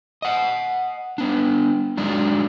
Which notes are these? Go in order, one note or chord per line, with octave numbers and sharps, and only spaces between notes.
D#5 F#5
B3 D4
F#3 G#3 D4 D#4